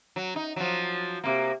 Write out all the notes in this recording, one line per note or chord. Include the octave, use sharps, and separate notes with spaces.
F#3
D#4
F3 F#3
C3 A#3